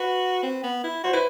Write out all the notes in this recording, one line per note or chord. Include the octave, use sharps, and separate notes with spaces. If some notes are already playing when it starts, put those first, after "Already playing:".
Already playing: F#4 B4
C4
B3
E4
F#4 C5
E4 B4